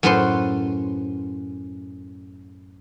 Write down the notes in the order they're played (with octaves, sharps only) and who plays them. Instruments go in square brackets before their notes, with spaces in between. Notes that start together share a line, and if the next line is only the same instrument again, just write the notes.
[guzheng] F#2 A2 A4 B4 C5 C6